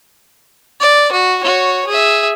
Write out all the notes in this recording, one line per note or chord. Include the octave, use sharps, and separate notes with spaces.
D5
F#4
F#4 C#5
G#4 E5